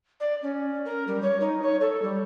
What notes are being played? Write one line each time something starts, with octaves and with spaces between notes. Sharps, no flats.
D5
C#4
A#4
G3
C#5
D#4
C#5
A4
G3